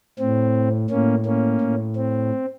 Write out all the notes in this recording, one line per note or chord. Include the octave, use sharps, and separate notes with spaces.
A2 C4
A2 A#3 C#4
A#3 C#4
A2
C4